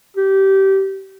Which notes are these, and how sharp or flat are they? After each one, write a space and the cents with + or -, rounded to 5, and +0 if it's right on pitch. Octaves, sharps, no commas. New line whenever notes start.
G4 -20